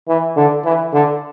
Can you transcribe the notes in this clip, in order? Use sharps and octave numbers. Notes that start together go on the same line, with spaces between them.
E3
D3
E3
D3